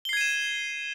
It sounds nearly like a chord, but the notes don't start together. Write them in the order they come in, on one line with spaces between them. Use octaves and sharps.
G7 C7 G#6 D#7 E7